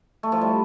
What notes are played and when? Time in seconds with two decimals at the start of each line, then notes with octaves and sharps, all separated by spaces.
0.23 A3
0.32 F3
0.41 G3